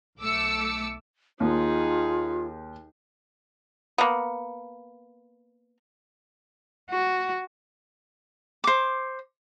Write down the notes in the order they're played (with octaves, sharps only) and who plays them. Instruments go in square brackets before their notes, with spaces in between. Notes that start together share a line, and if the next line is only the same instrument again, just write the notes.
[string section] B1 A3 D6 E6 C#7
[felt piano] D#2 [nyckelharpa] D#4 G#4 [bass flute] F4
[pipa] A#3 B3
[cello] F#4
[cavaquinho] C5 D6